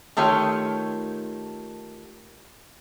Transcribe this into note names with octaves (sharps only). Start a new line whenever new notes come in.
D#3 A3 F4 G4 C#5